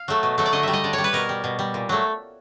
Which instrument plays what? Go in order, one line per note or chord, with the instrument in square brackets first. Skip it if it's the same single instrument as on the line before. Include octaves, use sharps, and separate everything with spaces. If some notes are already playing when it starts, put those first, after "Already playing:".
Already playing: [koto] F5
F#3 A3
B2
F#3 A3
D5
D3 D#5
G3 E5
D#5
D3 D5
C#5
G3
B4
B2 A#4
G3
B2
G3
A#2
F#3 A3